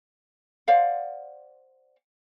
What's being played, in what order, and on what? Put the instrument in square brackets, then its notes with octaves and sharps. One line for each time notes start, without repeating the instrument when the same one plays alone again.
[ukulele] C5 D5 F5 F#5